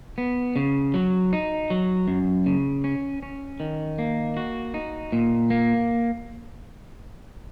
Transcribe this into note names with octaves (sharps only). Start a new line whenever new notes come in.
B3
C#3
F#3
D#4
F#3
F#2
C#3
C#4
C#4
D#3
A#3
F#4
D#4
A#2
A#3